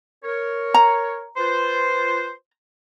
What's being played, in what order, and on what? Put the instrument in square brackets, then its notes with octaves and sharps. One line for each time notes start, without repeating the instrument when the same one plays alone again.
[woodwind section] A#4 C#5
[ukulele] A#5
[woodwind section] F4 B4 C5